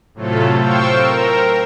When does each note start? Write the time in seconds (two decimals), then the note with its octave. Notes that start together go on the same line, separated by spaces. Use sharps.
0.14 A2 C3 F#3 A3 F4 A4
0.59 C5 F5 G5 C#6 E6
0.96 A#4